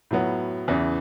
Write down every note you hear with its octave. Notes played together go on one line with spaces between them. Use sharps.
A2 F#3 B3
E2 C#3 E3